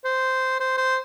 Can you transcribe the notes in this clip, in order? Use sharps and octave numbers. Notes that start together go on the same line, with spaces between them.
C5
C5
C5